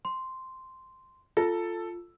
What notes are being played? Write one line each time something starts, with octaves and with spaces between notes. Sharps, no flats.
C6
F4 A4